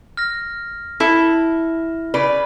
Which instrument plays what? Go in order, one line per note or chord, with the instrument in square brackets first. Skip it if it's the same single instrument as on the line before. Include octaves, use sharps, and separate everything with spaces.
[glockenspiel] F6 A#6
[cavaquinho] E4 [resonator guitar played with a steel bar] A4
[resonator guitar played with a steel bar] C#3 B4 D5